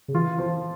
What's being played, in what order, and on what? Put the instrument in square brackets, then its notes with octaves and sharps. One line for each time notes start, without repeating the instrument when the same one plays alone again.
[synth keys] C#3
[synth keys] E3 [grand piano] F4
[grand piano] F3